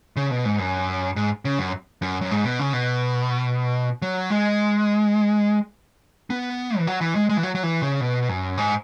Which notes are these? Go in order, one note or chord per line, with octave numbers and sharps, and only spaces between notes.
C#3
B2
G#2
F#2
G#2
C#3
F#2
F#2
F#2
G#2
B2
C#3
B2
F#3
G#3
B3
E3
F#3
E3
G#3
G#3
E3
F#3
F#3
E3
C#3
B2
F#2
G#2